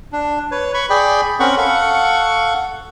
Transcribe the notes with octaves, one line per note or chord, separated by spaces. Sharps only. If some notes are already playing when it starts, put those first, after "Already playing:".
D4
B4 C#5
B5 C#6
G#4 D5 G5 B5
C4 C#4 A#4 F#5 B5 C#6
A4 F5 F#5 C#6